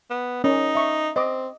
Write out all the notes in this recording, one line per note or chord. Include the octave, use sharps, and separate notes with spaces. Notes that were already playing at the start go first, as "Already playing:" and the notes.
B3
C#4 D#4 A#4
E5 C#6
C4 D#5 D6